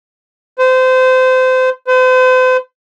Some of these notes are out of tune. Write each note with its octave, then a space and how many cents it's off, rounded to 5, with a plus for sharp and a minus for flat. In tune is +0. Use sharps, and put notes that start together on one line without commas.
C5 -25
C5 -40